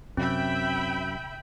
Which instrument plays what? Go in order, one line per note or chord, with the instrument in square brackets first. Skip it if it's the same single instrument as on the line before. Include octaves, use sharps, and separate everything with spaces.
[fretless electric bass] F#2 [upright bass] C3 [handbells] C4 [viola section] E5 G5 B5